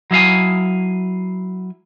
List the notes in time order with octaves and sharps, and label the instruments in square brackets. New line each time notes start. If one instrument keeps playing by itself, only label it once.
[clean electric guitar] F#3 E4 F5 G#5